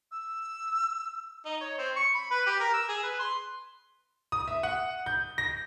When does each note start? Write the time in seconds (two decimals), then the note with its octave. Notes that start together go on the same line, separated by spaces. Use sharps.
0.12 E6
1.45 D#4
1.61 C#5
1.78 C4
1.96 C#6
2.15 B5
2.31 B4
2.46 G4
2.60 A#4
2.74 E6
2.89 G#4
3.03 B4
3.19 C6
4.32 D#6
4.48 E5
4.63 F#5
5.06 G6
5.38 A#6